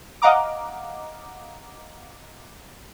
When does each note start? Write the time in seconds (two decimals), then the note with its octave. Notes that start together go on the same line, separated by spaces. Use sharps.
0.22 D#5 F5 F#5 A#5 D6